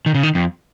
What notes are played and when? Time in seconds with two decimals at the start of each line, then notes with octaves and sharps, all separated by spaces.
0.06 D#3
0.15 C#3
0.23 D#3
0.35 F2